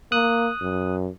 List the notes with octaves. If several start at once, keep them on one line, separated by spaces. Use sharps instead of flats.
A#3 D#6 F#6
F#2